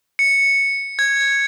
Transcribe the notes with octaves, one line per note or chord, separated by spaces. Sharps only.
C#7
G#6